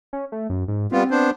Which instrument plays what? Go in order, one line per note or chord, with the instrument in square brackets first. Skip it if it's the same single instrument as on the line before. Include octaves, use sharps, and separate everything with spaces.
[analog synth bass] C#4
A3
F#2
G#2
[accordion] G3 B3 F4 [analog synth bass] C4
[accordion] B3 D4 C5